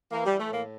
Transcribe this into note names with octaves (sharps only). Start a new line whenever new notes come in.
E3 A#3
G3
E3
A3
A2 A#3